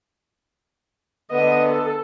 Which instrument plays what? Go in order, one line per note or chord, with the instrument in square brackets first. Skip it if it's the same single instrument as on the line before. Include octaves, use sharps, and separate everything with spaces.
[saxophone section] D3 B3 [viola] D#5
[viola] A4